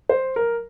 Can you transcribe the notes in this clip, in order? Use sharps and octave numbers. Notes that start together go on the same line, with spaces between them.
C5
A#4